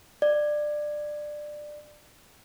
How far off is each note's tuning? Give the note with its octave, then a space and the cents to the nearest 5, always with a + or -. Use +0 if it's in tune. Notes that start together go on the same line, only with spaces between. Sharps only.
D5 +20